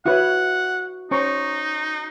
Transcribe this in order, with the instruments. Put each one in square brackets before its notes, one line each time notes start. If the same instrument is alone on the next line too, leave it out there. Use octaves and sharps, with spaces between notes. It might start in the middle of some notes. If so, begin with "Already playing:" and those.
[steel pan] E4 B4 C#5 [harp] F#4 [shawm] F#5
[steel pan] C#4 C5 A#5 [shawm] D#4 [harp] C#6